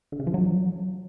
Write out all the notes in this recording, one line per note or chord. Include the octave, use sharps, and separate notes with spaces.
D3
C#3
F3
F#3